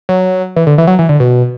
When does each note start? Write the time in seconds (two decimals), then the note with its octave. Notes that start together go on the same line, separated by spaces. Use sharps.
0.09 F#3
0.56 E3
0.67 D3
0.78 E3
0.87 F#3
0.99 E3
1.09 D3
1.20 B2